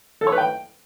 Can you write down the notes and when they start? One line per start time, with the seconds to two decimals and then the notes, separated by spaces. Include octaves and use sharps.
0.21 A4
0.27 C#5
0.32 B4
0.38 G5